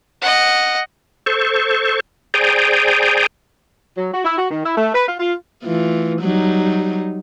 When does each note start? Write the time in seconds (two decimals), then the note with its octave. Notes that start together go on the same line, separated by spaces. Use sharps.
0.22 D#5 F#5
1.26 A4 C5 C#6
2.34 G#4 C5 D5 G5 G#5 A#5
3.97 F#3
4.12 F#4
4.25 E4
4.37 F#4
4.50 D#3
4.64 E4
4.77 A3
4.95 B4
5.08 F4
5.20 F4
5.64 E3 A3 F4
6.22 F#3 G3 D#4